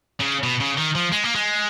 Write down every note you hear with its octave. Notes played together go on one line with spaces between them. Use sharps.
C#3
B2
C#3
D#3
F3
G#3
A#3
G#3